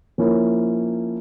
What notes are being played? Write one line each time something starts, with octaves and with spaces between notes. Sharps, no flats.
F3 A#3 C#4 E4